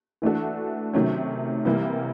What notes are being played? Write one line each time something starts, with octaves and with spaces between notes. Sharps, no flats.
E3 A3 D4 F#4 A4
C3 D#3 F#3 A3 C#4
C3 E3 G3 A#3